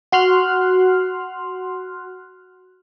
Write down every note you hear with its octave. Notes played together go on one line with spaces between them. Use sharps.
F#4 C6 F6 F#6